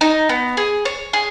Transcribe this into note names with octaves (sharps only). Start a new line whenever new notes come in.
D#4
B3
G#4
C#5
G#4